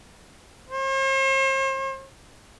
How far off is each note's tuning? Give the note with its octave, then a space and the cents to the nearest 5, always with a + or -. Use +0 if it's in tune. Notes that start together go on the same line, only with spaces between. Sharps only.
C5 +45